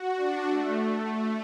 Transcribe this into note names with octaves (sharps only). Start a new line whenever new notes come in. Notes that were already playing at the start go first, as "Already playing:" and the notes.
Already playing: F#4
D4
A3